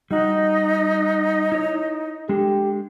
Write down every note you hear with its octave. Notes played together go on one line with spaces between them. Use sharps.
G3 D#4 F#4
E4 C#5
G#3 D4 G4 A4